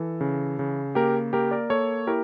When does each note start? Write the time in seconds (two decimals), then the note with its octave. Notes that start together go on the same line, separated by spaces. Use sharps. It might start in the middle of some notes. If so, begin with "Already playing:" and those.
Already playing: E3 A4
0.21 C#3
0.59 C#3
0.95 A#3 G4 A#4
1.33 A#3 G4 A#4
1.51 A#4 D5
1.70 A#3 A4 C#5
2.07 E4 G4 A#4